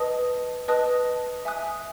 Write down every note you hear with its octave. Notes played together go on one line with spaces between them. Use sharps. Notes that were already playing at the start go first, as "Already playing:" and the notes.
Already playing: B4 D#5 A5 D#6
B4 D#5 A5 D#6 F#6
E5 G#5 D#6 F#6